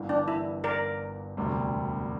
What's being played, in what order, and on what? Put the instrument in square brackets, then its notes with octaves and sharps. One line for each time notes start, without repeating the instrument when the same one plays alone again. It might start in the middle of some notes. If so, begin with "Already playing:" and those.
Already playing: [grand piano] G1 G2 E3 A#3
[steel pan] D4
E4
A#4 D5
[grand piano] E1 D2 C3 G3